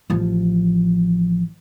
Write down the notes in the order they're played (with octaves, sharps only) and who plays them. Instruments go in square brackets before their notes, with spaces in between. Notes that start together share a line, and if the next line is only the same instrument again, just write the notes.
[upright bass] A1 F3